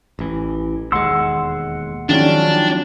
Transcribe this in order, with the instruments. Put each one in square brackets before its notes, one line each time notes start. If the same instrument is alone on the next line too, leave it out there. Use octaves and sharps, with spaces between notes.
[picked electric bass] A1 E3
[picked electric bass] E1 D#2 G#3 [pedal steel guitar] F#5 C6 E6
[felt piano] D#3 G#3 C#4 [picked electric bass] F3 F#3 [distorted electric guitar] D4